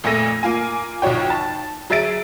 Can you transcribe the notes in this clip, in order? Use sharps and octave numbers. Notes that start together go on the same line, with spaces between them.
F2 A#2 A3 A4 A#6 D#7
A#3 F4 G#5
B1 F3 F#4 C#5 G5
A5
F#3 G#4 E5 A6 D7 D#7